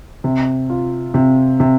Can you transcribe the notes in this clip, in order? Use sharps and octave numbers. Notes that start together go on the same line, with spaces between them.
C3
F4
C3
C3